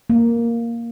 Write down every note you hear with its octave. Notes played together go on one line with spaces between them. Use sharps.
A#3